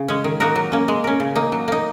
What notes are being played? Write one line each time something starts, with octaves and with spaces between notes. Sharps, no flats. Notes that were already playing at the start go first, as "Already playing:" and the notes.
Already playing: C#3
G#3 C#4
D#3
A#3 D#4 F#4 A#4
F#3
A#3 C#4
G#3
C#4 A#4
C#3
A#3 D#4
F#3
A#3 D#4